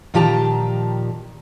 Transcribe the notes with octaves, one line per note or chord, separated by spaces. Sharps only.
A#2 D#3 F3 G4 A5 A#5